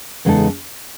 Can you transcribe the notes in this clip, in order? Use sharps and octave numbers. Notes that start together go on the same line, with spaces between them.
E2 C#3 G#3 D#4 A4